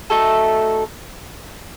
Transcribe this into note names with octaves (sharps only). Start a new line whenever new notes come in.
A3 D#4 F#4 A4